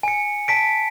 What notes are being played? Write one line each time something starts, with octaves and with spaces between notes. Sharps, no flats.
G#5 C#7
A5 B6 D7